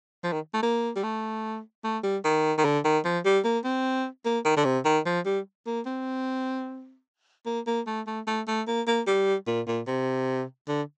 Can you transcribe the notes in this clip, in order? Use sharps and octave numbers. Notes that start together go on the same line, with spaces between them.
F3
D#3
A3
A#3
G3
A3
A3
G3
D#3
D#3
D3
D#3
F3
G3
A#3
C4
A#3
D#3
D3
C3
D#3
F3
G3
A#3
C4
A#3
A#3
A3
A3
A3
A3
A#3
A#3
G3
A#2
A#2
C3
D3